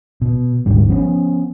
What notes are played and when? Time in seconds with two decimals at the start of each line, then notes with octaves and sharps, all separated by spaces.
0.21 B2
0.66 G1 D2 G#2 G3
0.88 F3 B3 C#4